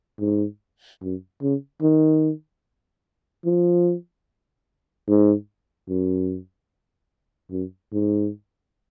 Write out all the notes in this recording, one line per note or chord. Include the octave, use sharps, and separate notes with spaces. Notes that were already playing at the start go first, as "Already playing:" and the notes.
G#2
F#2
C#3
D#3
F3
G#2
F#2
F#2
G#2